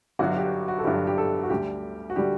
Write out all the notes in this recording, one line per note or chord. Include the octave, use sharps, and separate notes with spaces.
G1 G2 F#3 F#4
G4
F#4
A4
G1 G2 F#3 G4
G4
A4
F#4
D2 D3 G3 G4
F#4
D3 G3 G4